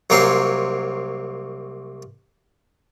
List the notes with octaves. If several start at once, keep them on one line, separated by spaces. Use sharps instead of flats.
C2 F#3 A#3 C4 C#5 C6